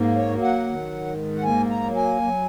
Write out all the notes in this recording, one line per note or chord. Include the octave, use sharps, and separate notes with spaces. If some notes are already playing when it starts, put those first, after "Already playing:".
Already playing: G#2 A#3
C#5
F#3
F#5
D#3
G#2
F#5
A#3 G#5
A#5
F#3
G#5
F#3